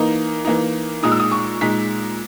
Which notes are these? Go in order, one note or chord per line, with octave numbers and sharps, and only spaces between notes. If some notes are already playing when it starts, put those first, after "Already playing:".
Already playing: E3 A#3 D#4
E3 A#3 D#4
A#2 G#3 D#4 D#6
E6
D#6
C#6
A#2 G#3 D#4 B6